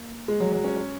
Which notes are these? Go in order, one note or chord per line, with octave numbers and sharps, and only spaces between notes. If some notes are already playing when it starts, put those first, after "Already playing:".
Already playing: A#3
G#3
F#3
F#3
C#4
C#4